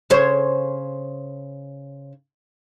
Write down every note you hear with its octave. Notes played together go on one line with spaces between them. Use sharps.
C#3 C5 C#5